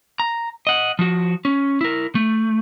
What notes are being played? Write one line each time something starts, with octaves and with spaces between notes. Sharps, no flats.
A#5
D#5 F#5
F3 F#4
C#4
E4 A#4
A3